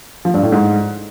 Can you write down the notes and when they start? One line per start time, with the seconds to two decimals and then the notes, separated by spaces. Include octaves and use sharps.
0.25 F3
0.34 G2
0.43 A2
0.52 G#2